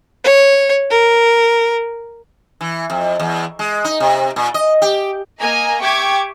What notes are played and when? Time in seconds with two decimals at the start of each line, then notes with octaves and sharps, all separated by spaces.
0.24 C#5
0.91 A#4
2.61 E3
2.90 F2
3.20 E2
3.59 G#3
3.84 D#4
4.00 C3
4.36 A#2
4.54 D#5
4.82 G4
5.40 A#3 D#5 G#5 A#5
5.81 G4 E5 G5 C#6 D6 G#6